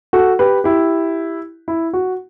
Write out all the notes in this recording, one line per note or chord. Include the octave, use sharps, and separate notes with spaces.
F#4 A4
G4 B4
E4 G4
E4
F#4